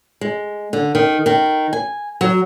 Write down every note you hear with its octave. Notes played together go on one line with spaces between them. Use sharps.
G#3
D3
D#3
D#3
G#5
F#3